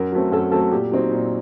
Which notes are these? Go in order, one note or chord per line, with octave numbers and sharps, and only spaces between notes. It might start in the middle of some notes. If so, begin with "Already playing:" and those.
Already playing: F#2 A#4
F#3 A3 C4
F#2 A4
F#3 A3 C4 A4
A#2 G4
F#3 C4 D#4
A#2